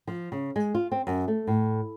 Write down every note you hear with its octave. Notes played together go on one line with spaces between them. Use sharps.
F3
C#3
G#3
F4
C4
F#2
A3
A2